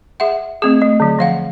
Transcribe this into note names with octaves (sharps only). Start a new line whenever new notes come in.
G#4 E5 F#5
A3 C4 G#4
A3
D3 F#3
F3 F5 F#5